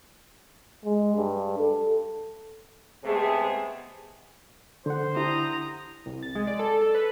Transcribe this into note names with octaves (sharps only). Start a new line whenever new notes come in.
G#3
G2
A4
C3 G#3 A3 B3 G#4
D3 C5 F#5
D4 E4 G4 A#5 D#6
C2
A6
G#3
D5
A4
A4
B4